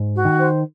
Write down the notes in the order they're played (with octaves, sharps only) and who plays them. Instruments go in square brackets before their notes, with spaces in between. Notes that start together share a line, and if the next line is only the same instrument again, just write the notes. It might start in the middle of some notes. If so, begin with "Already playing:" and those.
Already playing: [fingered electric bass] G#2
[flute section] F#4
[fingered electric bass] D#3
[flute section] C5